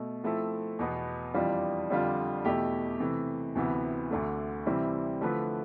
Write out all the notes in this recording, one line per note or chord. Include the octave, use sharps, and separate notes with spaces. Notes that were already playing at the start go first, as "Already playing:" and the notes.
Already playing: B2 A3
F3 A3 C4 E4 A4
E2 B2 B3
F2 E3 G3 D4 F4
F2 D3 G3 D4 F4
E2 B2 A3 E4 G4
C3 E3 A3
D2 C3 E3 B3
D2 D3 A3
C3 E3 G3 C4 E4
D3 F3 A3 E4 B4